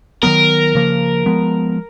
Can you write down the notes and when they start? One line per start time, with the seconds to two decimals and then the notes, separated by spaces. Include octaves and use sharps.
0.23 D#3 F#3 B3 A#4
0.75 C#3 F3 A#3
1.26 F3 G#3 B3